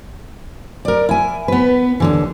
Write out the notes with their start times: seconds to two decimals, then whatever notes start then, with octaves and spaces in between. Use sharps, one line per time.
0.85 A#4 D5
1.09 E4 G#5
1.48 B3 B4
2.00 D#2 D3 E3